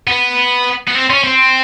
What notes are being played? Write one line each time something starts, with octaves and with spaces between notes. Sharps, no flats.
B3
B3
C4
C#4
C4